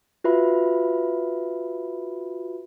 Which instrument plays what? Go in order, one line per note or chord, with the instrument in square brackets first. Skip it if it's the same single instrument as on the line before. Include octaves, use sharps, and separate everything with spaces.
[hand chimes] F4 F#4 B4 E5 B5